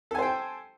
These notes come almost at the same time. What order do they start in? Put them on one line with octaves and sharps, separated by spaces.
A4 G#5 C5 G5